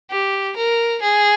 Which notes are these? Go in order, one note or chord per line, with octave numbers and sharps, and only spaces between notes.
G4
A#4
G#4